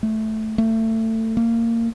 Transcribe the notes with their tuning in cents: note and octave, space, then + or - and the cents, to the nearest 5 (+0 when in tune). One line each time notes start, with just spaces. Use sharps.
A3 -10
A3 +25
A#3 -25